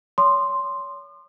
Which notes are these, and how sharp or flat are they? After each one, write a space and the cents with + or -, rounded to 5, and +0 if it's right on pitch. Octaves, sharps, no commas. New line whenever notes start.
C#5 +35 C6 +0 D#6 -45